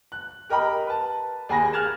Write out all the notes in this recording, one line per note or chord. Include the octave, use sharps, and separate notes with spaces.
F#6
G4 A#4 D#5 G5 B5
B4 A5
D#2 G#4 G#5 B5 A#6
F6 F#6 G#6 A6 E7